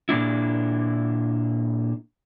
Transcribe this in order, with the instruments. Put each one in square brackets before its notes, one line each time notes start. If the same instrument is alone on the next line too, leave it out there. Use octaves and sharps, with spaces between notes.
[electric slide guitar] A#2 A#3 D4 E4